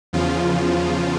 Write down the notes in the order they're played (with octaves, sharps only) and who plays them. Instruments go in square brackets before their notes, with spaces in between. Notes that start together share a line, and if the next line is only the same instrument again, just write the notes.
[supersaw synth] E2 C#3 F3 F4